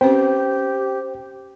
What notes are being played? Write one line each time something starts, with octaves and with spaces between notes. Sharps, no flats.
C4 C#4 G4 B4 C5 G5